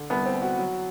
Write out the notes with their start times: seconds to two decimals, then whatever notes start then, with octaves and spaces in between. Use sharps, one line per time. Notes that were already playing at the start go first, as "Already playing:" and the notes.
Already playing: D3
0.10 C2 B3
0.26 C4
0.34 C2
0.42 F#4
0.58 F#3